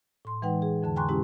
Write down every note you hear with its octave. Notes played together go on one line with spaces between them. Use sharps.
A2 C6
E3 G#3 D#4 B4 F#5 G5
G#4
F2 D3 A5
G5 G#5 A#5 C6 C#6 F#6
B2 G#3 C#4 E4 G4